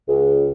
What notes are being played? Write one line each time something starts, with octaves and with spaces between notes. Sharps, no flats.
C#2